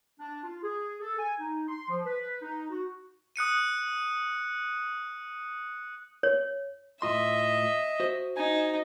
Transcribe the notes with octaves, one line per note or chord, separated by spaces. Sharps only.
D4
F4
G#4
A4
G#5
D#4
C6
F3
B4
D#4
F#4
D#6 F#6 C#7 D#7
C#5
A2 F4 D#5 E5 C6
F#4 C5
D#4 G#5